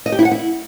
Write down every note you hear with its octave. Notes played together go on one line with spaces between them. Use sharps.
D#5
G4
E4
F#5
E4